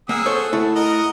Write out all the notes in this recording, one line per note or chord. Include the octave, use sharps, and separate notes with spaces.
A#3 G#4 F#5 E6
A4 C5 C#5
A3 E4 A4
A#4 D#5 F#5